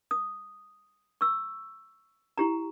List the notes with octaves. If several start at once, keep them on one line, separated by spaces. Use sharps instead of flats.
D#6
C#6 E6
E4 G4 A#5